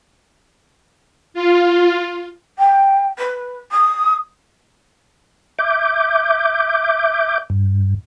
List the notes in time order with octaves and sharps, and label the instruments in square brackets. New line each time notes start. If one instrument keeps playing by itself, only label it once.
[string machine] F4
[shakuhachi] G5
B4
D#6
[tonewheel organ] E5 D6 G6
G2